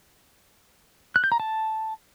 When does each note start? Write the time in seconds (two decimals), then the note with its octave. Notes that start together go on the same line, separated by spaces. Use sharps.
1.16 F#6
1.24 G6
1.32 A#5
1.40 A5